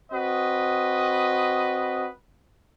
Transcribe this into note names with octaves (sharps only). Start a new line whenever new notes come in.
C4 F#4 B4 D#5